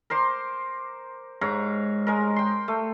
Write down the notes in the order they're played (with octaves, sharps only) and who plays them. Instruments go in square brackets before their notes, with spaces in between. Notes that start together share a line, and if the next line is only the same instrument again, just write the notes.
[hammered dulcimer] A#4 C5 C6 D6
G#2 C#5 F5 A#5
G#3 A#4
G5 C6
A3